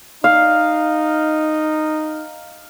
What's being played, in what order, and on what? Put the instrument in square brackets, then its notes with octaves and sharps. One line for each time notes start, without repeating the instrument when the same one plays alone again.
[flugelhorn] D#4 [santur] F5